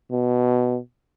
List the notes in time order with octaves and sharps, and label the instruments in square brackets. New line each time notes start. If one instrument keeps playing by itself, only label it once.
[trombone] B2